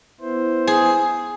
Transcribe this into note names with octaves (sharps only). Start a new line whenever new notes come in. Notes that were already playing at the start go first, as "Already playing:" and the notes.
B3 E4 C5
G#4